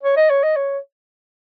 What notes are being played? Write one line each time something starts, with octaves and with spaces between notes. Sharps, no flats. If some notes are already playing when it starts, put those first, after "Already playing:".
C#5
D#5
C#5
D#5
C#5